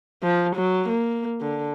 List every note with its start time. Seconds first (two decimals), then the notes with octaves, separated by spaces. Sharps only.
0.23 F3
0.56 F#3
0.88 A#3
1.41 D3